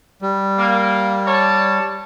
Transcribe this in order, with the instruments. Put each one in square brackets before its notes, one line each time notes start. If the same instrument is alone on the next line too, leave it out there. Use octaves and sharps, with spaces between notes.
[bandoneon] G3
[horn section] A#3
C#5 D5 A5